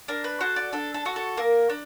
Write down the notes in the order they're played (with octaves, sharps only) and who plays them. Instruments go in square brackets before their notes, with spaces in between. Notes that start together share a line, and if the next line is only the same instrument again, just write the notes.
[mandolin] D4 A#4
B4
F#4 A4 C5
D5
D4 A4
A4
F#4 A4
A4
A#3 A#4
D4